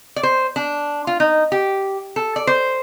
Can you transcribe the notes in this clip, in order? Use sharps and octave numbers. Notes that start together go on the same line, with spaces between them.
D5
C5
D4
F4
D#4
G4
A4
D5
C5